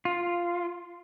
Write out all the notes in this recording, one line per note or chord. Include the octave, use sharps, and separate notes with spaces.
F4